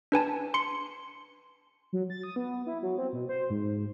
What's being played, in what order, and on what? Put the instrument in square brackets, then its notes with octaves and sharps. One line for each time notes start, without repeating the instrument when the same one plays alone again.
[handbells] D4 B4 G#5 A5
C6 C#7
[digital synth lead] F#3
A6
D#6
B3
E4
F#3
C4
B2
C5
G#2